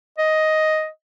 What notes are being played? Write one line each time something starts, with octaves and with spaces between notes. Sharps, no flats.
D#5